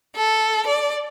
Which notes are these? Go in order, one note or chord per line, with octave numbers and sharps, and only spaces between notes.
A4
D5